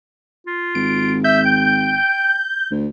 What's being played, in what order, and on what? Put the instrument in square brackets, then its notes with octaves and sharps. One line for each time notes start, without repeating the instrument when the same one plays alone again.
[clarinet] F4
[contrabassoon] G#1 [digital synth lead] D7
[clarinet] E5 [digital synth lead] G6
[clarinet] G5
[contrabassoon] D2